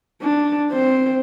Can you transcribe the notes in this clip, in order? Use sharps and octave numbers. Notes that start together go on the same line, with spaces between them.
D4
C4 C5